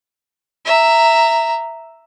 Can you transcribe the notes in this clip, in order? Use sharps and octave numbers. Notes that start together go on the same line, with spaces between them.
E5 A#5